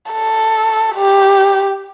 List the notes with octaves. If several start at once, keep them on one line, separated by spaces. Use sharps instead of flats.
A4
G4